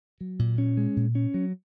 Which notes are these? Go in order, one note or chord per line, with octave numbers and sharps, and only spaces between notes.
F#3
A#2
C#4
G#3
A#2
C#4
F#3